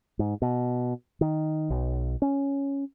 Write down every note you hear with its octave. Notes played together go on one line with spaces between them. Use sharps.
G#2
B2
D#3
B1
C#4